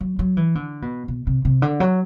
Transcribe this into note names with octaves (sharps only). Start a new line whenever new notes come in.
F#3
F#3
E3
D3
B2
B2
C3
C3
D3
F#3